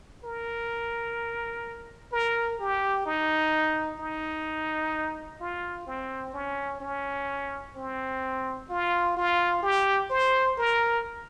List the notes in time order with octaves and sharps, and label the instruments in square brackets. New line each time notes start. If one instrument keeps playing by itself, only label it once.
[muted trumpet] A#4
A#4
G4
D#4
D#4
F4
C4
C#4
C#4
C4
F4
F4
G4
C5
A#4